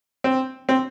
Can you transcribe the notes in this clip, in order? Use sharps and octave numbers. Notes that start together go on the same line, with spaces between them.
C4
C4